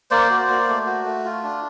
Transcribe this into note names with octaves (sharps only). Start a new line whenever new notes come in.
A#3 C5 D5
F#4
A#3
A3
F#4
A3
F4
D4